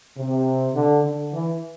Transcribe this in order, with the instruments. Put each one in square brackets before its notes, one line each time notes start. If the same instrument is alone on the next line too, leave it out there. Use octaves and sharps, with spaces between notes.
[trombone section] C3
D3
D3
E3